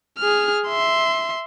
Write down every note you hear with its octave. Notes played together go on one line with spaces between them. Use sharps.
G#4 F6
E5 C6